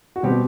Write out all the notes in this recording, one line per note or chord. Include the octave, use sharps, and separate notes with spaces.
F#4
B2 G3 C4 G4